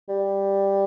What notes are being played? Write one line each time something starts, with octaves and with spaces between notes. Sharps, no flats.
G3